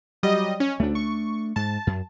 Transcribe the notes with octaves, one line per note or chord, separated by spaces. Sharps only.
F#3 G3 D#5
C#4
D2 A3 D4
C#6
G#2 A5
F#2